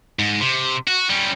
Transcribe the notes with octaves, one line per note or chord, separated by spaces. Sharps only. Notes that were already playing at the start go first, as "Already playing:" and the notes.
G#2
C3
F#4
G3 C#4